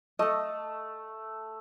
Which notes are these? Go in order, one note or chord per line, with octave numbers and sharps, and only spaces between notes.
A3 A4 D#5